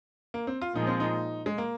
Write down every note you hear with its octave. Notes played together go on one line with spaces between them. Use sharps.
A#3
C4
F4
A#2 F3 G#3 D#4 F4
C4
D#4
G#3
A#3